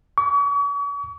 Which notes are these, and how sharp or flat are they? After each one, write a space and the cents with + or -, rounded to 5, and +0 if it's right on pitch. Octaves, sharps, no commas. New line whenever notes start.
C#6 +45